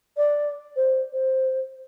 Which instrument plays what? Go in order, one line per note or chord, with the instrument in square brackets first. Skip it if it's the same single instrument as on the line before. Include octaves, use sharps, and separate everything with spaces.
[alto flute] D5
C5
C5